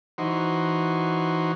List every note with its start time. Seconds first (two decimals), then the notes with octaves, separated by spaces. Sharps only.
0.18 E3 D#4 F#4 C5